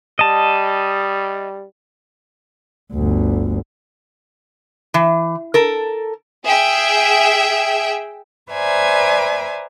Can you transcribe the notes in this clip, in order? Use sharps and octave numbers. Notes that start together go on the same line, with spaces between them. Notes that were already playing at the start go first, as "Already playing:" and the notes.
G3 D#5 A5
G1 D2
E3
A4 A#4
G#4 E5 G5
B4 C5 D5 E5 G#5 A#5